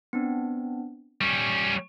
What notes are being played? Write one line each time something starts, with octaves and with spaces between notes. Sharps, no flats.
B3 C4 D4
G3 C#4 C#6